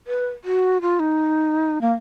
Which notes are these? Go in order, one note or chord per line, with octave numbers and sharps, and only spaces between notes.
B4
F#4
F4
D#4
A#3